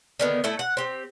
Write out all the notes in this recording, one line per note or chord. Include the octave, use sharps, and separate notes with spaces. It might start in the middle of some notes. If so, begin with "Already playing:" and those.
D3 D#3 B3
A3 E4 A4
F#5
C4 G4